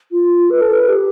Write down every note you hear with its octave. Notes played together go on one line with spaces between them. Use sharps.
F4
B4
A4
B4
G4